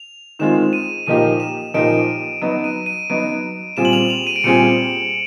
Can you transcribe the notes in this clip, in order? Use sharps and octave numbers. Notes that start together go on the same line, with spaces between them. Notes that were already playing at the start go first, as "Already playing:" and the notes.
Already playing: F7
D#3 G#3 C4 F4 E7
D#7
A#2 F3 A#3 D#4 G4 D#7
E7
A#2 F3 A#3 D#4 G4 D7
F#3 B3 D#4 D7
D#7
D#7
F#3 B3 D#4 D7
A#2 G3 C4 F4 G#4 E7
F#7
F7
F7
D#7
D7
A#2 G3 C4 F4 G#4 C#7